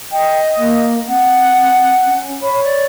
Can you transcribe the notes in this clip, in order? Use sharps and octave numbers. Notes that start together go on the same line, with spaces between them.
D#5 G5
A#3
C4 F#5
C#4
C#5 B5
D5